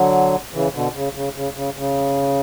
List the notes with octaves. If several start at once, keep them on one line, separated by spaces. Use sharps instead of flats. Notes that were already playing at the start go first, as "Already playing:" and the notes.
Already playing: D3 F#3
C#3 E3
B2 D3
C#3
C#3
C#3
C#3
C#3